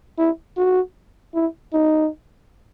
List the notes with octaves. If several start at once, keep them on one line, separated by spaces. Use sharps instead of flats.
E4
F#4
E4
D#4